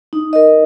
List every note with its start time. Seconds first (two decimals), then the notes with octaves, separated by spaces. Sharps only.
0.13 D#4
0.33 A#4 D#5